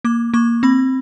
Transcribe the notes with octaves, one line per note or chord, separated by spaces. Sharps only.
A#3 D6
A#3 C#6
C4 B5